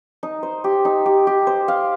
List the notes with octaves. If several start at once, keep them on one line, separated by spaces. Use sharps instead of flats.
D#4
C5
G4
D#4
G4
G4
C5
F5